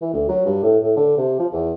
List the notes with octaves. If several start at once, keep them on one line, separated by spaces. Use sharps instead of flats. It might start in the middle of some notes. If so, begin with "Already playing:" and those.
E3
D2
F#3
G2
A2
A2
D3
C3
F3
E2